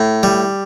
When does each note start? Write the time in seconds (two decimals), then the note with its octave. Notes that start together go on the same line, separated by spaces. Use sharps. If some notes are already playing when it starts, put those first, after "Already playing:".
Already playing: A2
0.23 G3